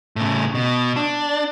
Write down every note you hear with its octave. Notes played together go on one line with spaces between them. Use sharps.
A2 C#3
B2
D4